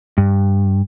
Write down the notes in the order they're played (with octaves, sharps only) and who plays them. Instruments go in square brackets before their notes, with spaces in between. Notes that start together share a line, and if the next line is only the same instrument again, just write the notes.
[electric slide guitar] G2